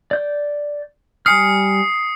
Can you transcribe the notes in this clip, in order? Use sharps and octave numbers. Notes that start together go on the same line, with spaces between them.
D5 G6
G3 G#5 D#6 F6 C7 C#7